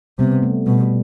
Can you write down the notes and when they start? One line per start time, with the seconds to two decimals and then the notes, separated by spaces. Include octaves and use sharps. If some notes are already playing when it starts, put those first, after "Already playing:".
0.19 C3 G3 B3
0.43 A3
0.67 B2 G3